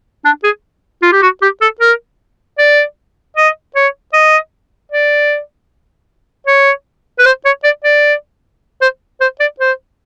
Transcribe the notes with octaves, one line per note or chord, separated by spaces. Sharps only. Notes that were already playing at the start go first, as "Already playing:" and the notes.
D4
G#4
F4
G4
F#4
G4
A4
A#4
D5
D#5
C#5
D#5
D5
C#5
B4
C5
C#5
D5
D5
C5
C5
D5
C5